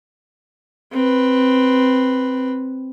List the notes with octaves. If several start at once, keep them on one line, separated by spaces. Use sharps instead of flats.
C4 B4